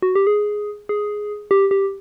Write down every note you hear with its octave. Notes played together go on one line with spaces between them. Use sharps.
F#4
G4
G#4
G#4
G4
G4